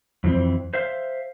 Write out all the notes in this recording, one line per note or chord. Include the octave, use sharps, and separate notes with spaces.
F2 E3 C4
C5 E5 F5